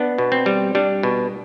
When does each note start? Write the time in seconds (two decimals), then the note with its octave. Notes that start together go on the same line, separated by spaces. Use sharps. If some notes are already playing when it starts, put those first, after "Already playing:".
Already playing: B3 D4
0.18 B2
0.32 C4
0.46 G3
0.75 G3 D4
1.03 B2